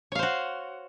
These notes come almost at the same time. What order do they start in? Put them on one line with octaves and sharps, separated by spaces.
C#5 F5 C5 F#4